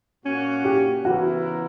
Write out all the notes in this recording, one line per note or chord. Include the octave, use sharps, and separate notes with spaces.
A#2 A#3 C#4 F#4
G4
C#3 E3 B3 E4 F#4 A#4